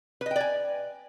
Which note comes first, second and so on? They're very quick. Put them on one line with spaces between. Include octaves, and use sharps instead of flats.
B4 D#5 G5 D5 G#5